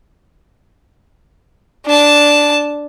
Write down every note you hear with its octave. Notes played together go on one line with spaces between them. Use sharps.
D4 A5